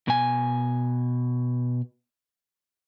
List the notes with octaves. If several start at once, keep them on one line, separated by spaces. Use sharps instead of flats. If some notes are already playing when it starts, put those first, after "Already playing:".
B2 G#5